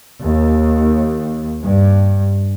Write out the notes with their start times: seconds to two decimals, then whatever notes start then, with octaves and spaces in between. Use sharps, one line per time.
0.22 D#2
1.63 G2